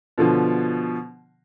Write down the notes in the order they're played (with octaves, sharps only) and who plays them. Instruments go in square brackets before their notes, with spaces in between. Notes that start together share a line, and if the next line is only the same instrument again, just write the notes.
[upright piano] B2 D3 F3